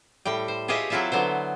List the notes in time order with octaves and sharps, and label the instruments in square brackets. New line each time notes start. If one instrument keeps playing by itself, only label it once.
[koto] A2 G3 G5
C5
F4 G4 G#4 C#5 D#5 E5
F#3 C4 E4 F4 A4 E5
D3 F#3 B3 C5